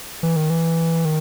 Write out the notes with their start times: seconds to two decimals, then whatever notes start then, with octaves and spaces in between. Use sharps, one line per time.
0.23 E3
0.36 D#3
0.50 E3
1.05 D#3